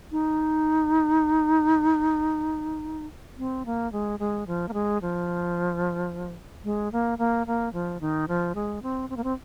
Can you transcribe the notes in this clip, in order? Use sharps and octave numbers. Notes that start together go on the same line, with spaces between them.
D#4
C4
A#3
G#3
G#3
F3
A#3
G#3
F3
G#3
A#3
A#3
A#3
F3
D#3
F3
G#3
C4
C4
A#3
C4